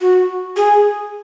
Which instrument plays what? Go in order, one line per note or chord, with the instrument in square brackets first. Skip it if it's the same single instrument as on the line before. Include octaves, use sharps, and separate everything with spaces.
[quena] F#4
G#4